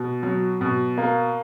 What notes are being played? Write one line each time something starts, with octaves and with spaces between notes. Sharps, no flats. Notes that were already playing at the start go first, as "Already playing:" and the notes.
Already playing: B2
F#3
B2
A#3